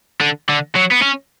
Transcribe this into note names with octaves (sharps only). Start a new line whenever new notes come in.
D3
D3
F#3
B3
C#4